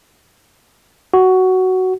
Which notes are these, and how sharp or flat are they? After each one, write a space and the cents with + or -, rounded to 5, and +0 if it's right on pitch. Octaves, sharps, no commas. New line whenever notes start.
F#4 +10